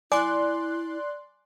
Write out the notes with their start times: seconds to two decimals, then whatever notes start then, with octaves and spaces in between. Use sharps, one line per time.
0.12 E4 D5 G#5 C6 D6 F#6